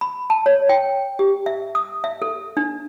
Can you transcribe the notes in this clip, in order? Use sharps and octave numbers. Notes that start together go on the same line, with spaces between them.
B5
A5
C#5
G5
G4
E5
D#6
E5
A4
D4